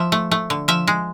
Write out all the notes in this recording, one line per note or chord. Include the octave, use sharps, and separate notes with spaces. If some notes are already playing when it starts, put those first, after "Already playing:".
Already playing: F3 E5
A3
A3
D3
F3 E5
G#3